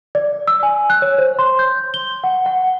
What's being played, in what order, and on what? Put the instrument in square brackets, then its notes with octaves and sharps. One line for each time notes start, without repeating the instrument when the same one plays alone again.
[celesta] D5
E6
G#5
F#6
C#5
C5
C6
G6
G7
F#5
F#5